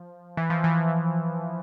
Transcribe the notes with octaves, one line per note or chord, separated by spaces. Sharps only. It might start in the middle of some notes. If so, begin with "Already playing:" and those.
Already playing: F3
E3
F3
E3